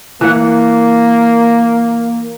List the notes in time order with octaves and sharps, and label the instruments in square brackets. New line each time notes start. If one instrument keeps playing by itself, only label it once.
[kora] E3 F#5 [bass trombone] A#3